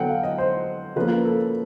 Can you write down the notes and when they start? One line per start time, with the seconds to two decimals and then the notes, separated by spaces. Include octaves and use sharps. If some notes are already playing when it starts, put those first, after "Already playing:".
Already playing: D3 F#3 B3 F#5 G5
0.09 F5
0.23 D#5
0.38 C5
0.96 C#3 F3 A#3 B4
1.25 A4